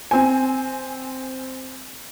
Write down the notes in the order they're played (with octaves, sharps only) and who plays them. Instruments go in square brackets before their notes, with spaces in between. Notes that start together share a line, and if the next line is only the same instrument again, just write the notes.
[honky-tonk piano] C4 G#5